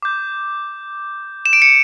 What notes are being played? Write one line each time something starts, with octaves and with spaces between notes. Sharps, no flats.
D6 G6
E7
D7
C#7